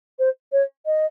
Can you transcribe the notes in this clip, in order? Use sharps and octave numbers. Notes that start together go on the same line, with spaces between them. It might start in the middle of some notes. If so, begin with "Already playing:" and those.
C5
C#5
D#5